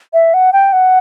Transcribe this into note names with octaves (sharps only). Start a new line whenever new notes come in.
E5
F#5
G5
F#5